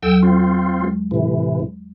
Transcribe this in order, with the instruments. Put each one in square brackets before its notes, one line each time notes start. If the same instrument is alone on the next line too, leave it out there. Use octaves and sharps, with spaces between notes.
[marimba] E2 F#3 A4 [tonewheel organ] G5 E6
[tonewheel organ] C4 F4
[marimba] G#3
[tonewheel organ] A2 C3 E3